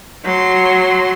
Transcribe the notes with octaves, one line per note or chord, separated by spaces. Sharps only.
F#3 C6